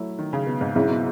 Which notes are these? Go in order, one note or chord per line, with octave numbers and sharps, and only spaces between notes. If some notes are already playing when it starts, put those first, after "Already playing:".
Already playing: F#3 A3 E4
D#3
C#3
B2
G#2
G#2 C#3 F#3 C#4 E4
B2